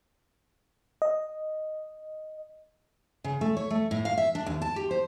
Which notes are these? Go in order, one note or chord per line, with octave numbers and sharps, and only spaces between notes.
D#5
C#3
A3
C#5
A3
A2
F5
E5
D4
D#2
A5
G4
C5